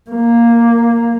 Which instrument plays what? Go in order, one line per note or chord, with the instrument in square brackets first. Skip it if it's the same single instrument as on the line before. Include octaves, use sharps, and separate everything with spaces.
[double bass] A#3